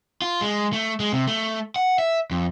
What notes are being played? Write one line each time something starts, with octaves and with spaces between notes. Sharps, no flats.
F4
G#3
A3
G#3
C3
A3
F#5
E5
F2